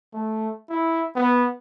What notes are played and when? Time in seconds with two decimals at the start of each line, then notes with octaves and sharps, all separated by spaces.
0.13 A3
0.70 E4
1.16 B3